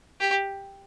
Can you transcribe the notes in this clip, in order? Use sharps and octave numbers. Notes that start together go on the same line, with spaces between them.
G4